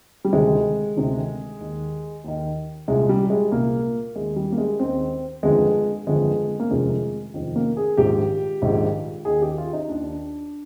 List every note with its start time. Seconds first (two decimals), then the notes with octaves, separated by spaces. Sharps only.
0.25 G3
0.33 D2 C3 D#3 G#3
0.96 D2 C3 D#3
1.60 D#2 D#3
2.24 D#2 D#3
2.88 C2 A#2 G#3
3.09 G3
3.30 G#3
3.52 C2 A#2 A#3
4.16 D#2 D#3 G#3
4.36 G3
4.52 A#3
4.58 G#3
4.79 D#2 D#3 C4
5.43 G1 F2 D3 G#3
6.07 G1 F2 D3 G#3
6.60 A#3
6.70 F1 F2 C3 D#3 G#3
7.34 F1 F2 C3 D#3
7.56 A#3
7.77 G#4
7.97 A#1 G#2 D#3 G4
8.62 A#1 G#2 D#3
9.25 D#2 D#3 G#4
9.42 G4
9.58 F4
9.73 D#4
9.89 D#2 D#3 D4